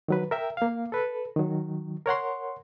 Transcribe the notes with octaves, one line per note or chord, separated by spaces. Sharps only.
D#3 F#3 B4
A#4 E5 G5
A#3 F5
A4 B4
D#3 F#3
A#4 C#5 F#5 C6